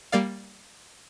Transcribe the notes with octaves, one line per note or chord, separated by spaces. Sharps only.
G3 A#3 D5 F5